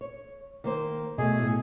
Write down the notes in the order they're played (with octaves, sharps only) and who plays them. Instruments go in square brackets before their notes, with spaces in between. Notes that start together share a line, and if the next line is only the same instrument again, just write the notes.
[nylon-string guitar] C#5
D#3 A#3 C5
[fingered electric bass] B2 [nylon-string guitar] A3 F#4 D#5 [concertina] G#4
[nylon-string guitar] A2